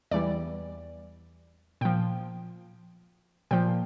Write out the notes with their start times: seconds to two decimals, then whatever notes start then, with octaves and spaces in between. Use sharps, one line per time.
0.11 E2 E3 G3 D5
1.81 A#2 F3 G5
3.51 A#2 F3 G5